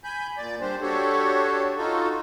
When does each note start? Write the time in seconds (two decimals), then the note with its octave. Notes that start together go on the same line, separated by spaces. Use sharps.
0.04 G#5 B5 G6
0.38 A#2 D5
0.61 G3 D4 G4 C5
0.81 D4 F#4 G4 A4 C#5
1.77 D#4 F4 F#4 A4